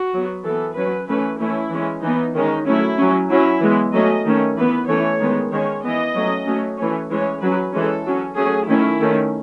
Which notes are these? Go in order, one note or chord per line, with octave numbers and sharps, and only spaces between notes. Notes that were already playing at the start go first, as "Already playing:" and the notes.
Already playing: F#4
F#3 B3
E3 B3 A4
F#3 C#4 B4
E3 A3 C#4 B4
E3 A3 C#4 E4
E3 G#3 C#4
E3 B3 D#4
D#3 G#3 C#4 D#4
F#3 A3 C#4 E4
F#3 C#4
F#3 C#4 E4
E3 G#3 B3
F#3 A3 C#4 D#5
D#3 A3 C#4
E3 B3 B4
E3 A3 C#4 C#5
D#3 G#3 B3
D#3 G#3 C#4 C#5
E3 B3 D#5
F#3 A3 C#4
F#3 A3 C#4
E3 A3 C#4 C#5
E3 G#3 C#4 C#5
F#3 C#4 B4
E3 G#3 C#4 A4
F#3 C#4
F#3 A3 C#4 G#4
D#3 A3 C#4 E4
D#3 A3 C#4